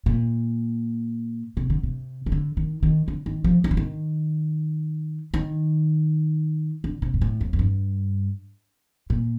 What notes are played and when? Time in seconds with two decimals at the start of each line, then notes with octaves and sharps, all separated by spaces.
0.06 A#2
1.57 C3
1.70 D3
1.83 C3
2.26 D#3
2.32 D3
2.57 D#3
2.83 D#3
3.08 D3
3.26 D#3
3.44 F3
3.64 D#3
3.71 D3
3.77 D#3
5.34 D#3
6.84 D3
7.02 C3
7.14 G2
7.21 A2
7.41 F2
7.53 F2
7.59 G2
9.10 A#2